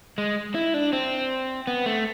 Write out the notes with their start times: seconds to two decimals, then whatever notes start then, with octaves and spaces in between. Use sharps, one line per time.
0.18 G#3
0.55 E4
0.74 D4
0.93 C4
1.67 B3
1.86 A3